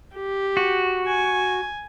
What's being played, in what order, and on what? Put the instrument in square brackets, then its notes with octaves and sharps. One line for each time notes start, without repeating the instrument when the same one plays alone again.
[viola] G4
[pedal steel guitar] F#4
[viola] G#5